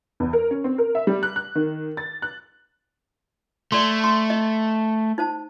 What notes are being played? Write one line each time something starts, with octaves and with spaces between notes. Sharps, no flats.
E2
A#4
C#4
C4
A#4
E5
G3
F#6
F#6
D#3
A6
F#6
A3 D5 C6
C6
D#5
D#4 C5 A5